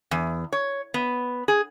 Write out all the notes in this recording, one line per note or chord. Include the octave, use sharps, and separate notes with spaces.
E2
C#5
B3
G#4